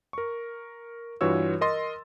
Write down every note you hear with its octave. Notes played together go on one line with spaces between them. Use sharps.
A#4 C#6
G2 E3 F4 F#4 C#5 E6
A#4 D#5 C6 A6